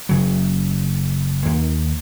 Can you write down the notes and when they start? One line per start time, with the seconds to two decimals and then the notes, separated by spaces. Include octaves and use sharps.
0.09 F#1 C#3 F#3
1.46 D#2 A#3